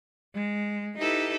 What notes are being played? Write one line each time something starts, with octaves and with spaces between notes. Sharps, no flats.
G#3
D#4 E4 G4 A4 B4